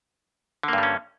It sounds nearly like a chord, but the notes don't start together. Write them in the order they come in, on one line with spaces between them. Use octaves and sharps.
D3 A#3 G2 G3 C#4